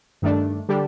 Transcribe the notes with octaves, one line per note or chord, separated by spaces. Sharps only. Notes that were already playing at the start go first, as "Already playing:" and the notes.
G2 D#3 A3 D4
D3 G3 D4 G4